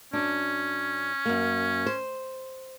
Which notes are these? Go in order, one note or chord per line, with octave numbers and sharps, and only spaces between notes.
F#2 C#4 D4
F#2 A#3
C5